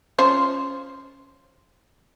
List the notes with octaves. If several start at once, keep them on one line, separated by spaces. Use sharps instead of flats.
F3 C#4 C5